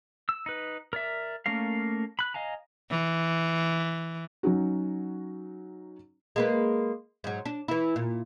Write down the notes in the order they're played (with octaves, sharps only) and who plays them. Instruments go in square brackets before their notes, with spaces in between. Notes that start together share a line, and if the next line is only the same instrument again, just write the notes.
[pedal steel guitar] E6
D#4 B4
A#4 D5 E5
A3 A#3 C#4 A#4 F5
B5 F#6
D#5 F5 G#5 A#5
[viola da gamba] E3
[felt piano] F#3 C#4 D#4 F#4
[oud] G#3 A#3 B4
G#2 F#3
D4
E3 E4
A#2